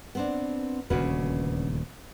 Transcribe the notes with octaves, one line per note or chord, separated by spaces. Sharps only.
B3 C4 D4
D#1 D2 C#3 C#4 F#4 B4